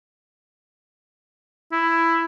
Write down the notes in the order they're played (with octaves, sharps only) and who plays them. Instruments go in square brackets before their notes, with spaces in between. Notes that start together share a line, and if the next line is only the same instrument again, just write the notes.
[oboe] E4